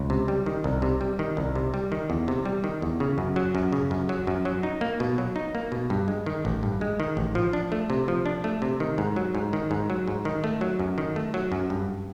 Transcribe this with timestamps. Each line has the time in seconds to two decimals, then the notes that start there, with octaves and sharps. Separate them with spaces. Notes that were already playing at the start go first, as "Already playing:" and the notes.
Already playing: C#2
0.10 C3
0.28 G3
0.46 D#3
0.64 C2
0.82 C3
1.01 G3
1.19 D#3
1.37 C2
1.55 C3
1.74 G3
1.92 D#3
2.10 E2
2.28 C3
2.45 G3
2.64 D#3
2.82 E2
3.00 C#3
3.18 F#2
3.36 F#3
3.55 F#2
3.73 C#3
3.91 F#2
4.09 F#3
4.27 F#2
4.45 F#3
4.63 D#4
4.81 A#3
5.00 B2
5.18 F#3
5.36 D#4
5.55 A#3
5.72 B2
5.90 G2
6.08 G#3
6.26 D#3
6.45 A1
6.63 G2
6.81 G#3
7.00 D#3
7.17 A1
7.35 F3
7.53 D4
7.72 A3
7.90 C3
8.08 F3
8.26 D4
8.44 A3
8.62 C3
8.80 D#3
8.98 G#2
9.16 F#3
9.35 G#2
9.53 D#3
9.71 G#2
9.90 F#3
10.08 G#2
10.25 D#3
10.44 A3
10.61 F#3
10.79 F#2
10.98 D#3
11.16 A3
11.34 F#3
11.52 F#2
11.70 G2